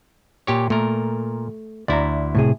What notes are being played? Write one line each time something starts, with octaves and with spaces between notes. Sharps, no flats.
A#2 G4 C#5
A#2 A3 A#4
D2 E4 D5 A#5
A2 C3 G#4